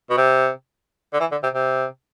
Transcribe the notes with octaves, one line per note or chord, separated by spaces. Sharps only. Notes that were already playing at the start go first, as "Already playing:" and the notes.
B2
C3
D3
E3
D3
C3
C3